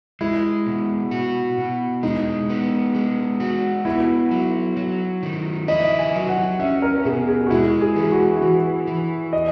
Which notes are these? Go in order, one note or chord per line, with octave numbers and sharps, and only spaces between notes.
G#3 E4
B2
F#4
B2
G#3 D#4
B3
G#3
F#4
B3 E4
F#3
F#3
D#3
E4 D#5
G#5
F#3
F#5
C#4 E5
A#4
B2 G#4
G#4
F#4
G#3 E4
G#4
E3
F#4
E4
E3 F#4
E3
D#5